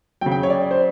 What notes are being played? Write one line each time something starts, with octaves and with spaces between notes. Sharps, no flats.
C#3 F#3 G5
G5
C#5
D5
C5